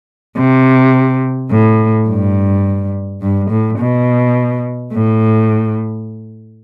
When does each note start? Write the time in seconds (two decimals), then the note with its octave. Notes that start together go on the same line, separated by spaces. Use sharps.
0.37 C3
1.50 A2
2.08 G2
3.22 G2
3.51 A2
3.79 B2
4.93 A2